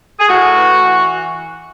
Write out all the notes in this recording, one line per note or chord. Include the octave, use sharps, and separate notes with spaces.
G#4
A2 F#4
E3
E3